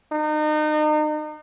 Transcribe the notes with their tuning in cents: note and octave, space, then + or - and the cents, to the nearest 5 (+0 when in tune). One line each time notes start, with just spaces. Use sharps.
D#4 -35